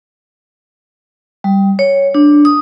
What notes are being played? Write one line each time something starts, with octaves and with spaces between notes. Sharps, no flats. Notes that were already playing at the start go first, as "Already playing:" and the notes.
G3
C#5
D4
D#6